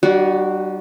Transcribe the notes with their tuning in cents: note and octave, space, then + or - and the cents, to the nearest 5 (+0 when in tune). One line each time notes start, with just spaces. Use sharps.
G3 -30 D4 +45 F#4 +0